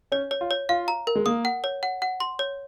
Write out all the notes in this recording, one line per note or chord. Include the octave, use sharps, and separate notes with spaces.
C#4 C#5
C#5
F4
C#5
F4 F5
A#5
A#4
G#3
A#3 D#6
F#5
C#5
F#5
F#5
C6
C#5